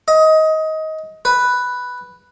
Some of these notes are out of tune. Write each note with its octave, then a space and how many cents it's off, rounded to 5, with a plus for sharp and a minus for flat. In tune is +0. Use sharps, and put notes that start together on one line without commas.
D#5 +20
B4 +0